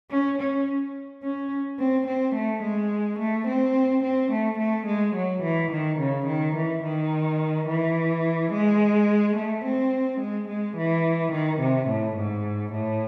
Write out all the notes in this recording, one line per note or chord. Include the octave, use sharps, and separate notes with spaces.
C#4
C#4
C#4
C4
C4
A3
G#3
A3
C4
C4
A3
A3
G#3
F#3
E3
D#3
C#3
D#3
E3
D#3
E3
G#3
A3
C4
G#3
G#3
E3
D#3
C3
A2
G#2
A2